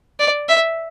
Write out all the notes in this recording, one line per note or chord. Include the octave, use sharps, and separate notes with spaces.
D5
E5